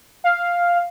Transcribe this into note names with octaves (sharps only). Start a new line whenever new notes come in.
F5